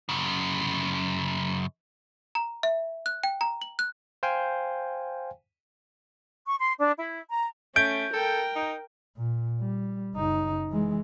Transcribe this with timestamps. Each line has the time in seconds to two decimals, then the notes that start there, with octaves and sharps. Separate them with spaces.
0.09 F#2 C#3
2.35 A#5
2.63 E5
3.06 F#6
3.24 G5
3.41 A#5
3.62 F#7
3.79 F#6
4.23 C5 F5 G5 G#5
6.47 C#6
6.60 C6
6.79 D4
6.97 E4
7.30 A#5
7.76 A3 C#4 G6 D7
8.14 A4 A#4 G5
8.56 D#4
9.17 A#2
9.61 G3
10.15 F#1 D#4
10.70 E3 G#3